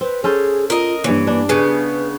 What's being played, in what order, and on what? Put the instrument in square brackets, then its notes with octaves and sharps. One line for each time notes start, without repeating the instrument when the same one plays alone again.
[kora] C4 [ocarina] B4
[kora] C#4 A4 C5 [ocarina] G#4
[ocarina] F4 [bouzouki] A#4 D#5
[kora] G2 C#5 [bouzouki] E3 [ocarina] A#3
[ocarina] A#3 [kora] D4
[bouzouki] C#3 B3 [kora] G#4 [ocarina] B4